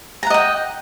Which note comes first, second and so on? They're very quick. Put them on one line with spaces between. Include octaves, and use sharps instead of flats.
A#5 F#5 D#5 G5